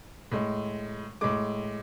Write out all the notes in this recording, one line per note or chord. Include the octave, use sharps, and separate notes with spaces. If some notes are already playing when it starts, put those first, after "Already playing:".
A2 G#3
A2 G#3 D6